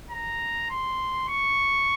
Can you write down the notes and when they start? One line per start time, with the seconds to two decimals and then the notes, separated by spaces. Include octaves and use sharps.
0.11 A#5
0.70 C6
1.28 C#6